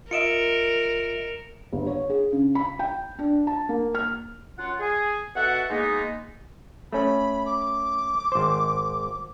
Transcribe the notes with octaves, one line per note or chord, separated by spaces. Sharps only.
F4 A#4 D#5 E5 C#7 D7 E7
G1
C#5
G#4
C#3
B5
G5
D4
A5
A#3
F6
F#2 F4 F#5
G#4
B2 F#4 A4 E5 F#5
G#3 A#3 B3 D#4
A3 C#4 B5
D6
G#1 C5